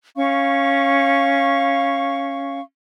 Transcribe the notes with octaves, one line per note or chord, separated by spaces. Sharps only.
C#4 F5 C#6